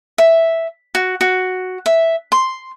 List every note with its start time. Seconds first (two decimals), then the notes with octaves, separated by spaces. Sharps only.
0.18 E5
0.95 F#4
1.21 F#4
1.86 E5
2.32 C6